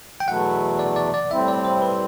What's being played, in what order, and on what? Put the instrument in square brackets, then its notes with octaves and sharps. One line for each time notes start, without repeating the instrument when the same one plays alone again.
[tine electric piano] G5
[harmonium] E2 B2 F#3 A3 E4 [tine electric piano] F#5
[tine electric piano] D5
D5
D5
[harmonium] A2 G3 C4 E4 [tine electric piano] E5
[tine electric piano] D5
C5
B4